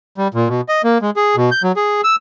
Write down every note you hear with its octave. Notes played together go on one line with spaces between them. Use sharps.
G3
A#2
B2
D#5
A#3
G#3
G#4
B2
G6
F#3
G#4
E6